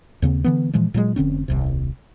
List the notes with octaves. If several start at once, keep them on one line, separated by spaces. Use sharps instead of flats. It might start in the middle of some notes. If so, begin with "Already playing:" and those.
D#2 C#3 C4
D3 E3 B3
A#2 E3 F3 G#3
A#2 F#3 G#3
F1 D3 C4 C#4
D#1 C2 C3